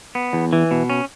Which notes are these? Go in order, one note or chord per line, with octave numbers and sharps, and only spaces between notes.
B3
E2
E3
B2
C#4